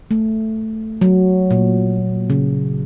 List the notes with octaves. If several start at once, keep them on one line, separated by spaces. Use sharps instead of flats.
A3
F#3
A#2
C#3